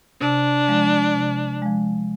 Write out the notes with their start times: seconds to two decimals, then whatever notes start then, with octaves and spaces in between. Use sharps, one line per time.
0.21 C3 D4
0.68 F3 G#3
1.15 C3
1.62 F3 G#3